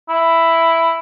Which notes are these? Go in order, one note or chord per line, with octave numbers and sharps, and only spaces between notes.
E4